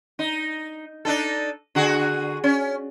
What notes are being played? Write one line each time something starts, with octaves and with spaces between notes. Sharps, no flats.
D#4
D4 D#4 A4
D3 F#4 G#4
C#4